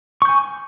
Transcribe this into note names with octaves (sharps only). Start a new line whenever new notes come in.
G#5 C#6 G6